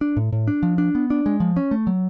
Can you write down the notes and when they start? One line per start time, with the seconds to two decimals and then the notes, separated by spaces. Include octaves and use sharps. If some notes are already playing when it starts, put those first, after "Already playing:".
0.01 D4
0.17 A2
0.32 A2
0.48 D4
0.63 F3
0.78 D4
0.95 B3
1.10 D4
1.26 G#3
1.40 F3
1.57 C#4
1.71 A3
1.87 F#3